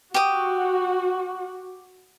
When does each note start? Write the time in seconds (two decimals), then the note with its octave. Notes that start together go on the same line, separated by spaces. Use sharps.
0.14 F#4 G4 D#6